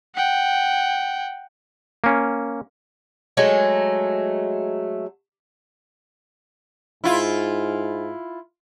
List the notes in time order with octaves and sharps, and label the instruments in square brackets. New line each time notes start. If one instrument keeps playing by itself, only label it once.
[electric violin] F#5 G5
[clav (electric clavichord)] A#3 C#4
[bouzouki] F#3 G#3 A3
[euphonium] G#2 [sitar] E4 F4